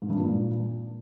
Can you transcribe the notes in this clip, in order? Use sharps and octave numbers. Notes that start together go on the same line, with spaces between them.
G#2
G2
A#2